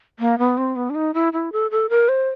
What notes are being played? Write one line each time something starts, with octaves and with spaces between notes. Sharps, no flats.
A#3
B3
C4
B3
D4
D#4
E4
E4
A4
A4
A#4
C5